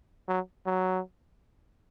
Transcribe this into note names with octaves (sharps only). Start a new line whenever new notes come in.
F#3
F#3